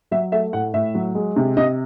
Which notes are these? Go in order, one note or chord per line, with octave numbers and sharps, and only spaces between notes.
F#3 E5
A3 E5
A2 F#5
A2 E5
F#3
G#3
C3
C3 D#5